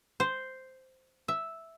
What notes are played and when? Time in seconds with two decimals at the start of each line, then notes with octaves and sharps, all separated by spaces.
0.20 C5
1.28 E5